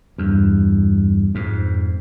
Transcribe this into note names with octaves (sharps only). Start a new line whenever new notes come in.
E2 G2
F2 G#2